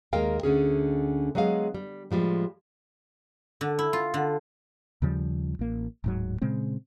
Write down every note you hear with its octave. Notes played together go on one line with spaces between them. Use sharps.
D#2 G#3 A#3 A#4 F5 G5
D2 D3 C#4 G#4
F#3 G#3 B3 G#4 F5
G3
A2 F3 G3 G#3
D3
E4
F4
D3
D#2 C#3 F3 G3
A1 A#3
D1 G#2 F#3
A#2 C#3 G#3 C4